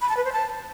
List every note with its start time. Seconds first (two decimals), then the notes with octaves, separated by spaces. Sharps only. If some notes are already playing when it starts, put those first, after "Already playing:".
0.01 B5
0.09 A5
0.17 B4
0.24 C5
0.32 A5